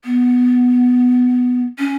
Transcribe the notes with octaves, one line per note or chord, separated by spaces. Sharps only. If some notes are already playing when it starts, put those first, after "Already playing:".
B3
C#4